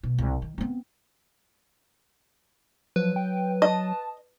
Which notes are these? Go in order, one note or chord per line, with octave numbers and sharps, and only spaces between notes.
B2
C2
D#3
B3 C4
F3 F#3 B4
G5
D#5 A5